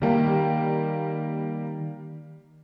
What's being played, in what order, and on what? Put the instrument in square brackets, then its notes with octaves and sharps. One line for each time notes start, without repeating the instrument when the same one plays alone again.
[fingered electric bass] D#3 [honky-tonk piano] G3 A#3